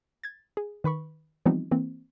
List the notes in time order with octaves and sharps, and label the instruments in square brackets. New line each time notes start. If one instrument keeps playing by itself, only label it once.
[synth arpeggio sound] G#6 A6
G#4
D#3 B4 B5 C#6
E3 F3 G3 B3 C4 D#4
E3 A#3 C4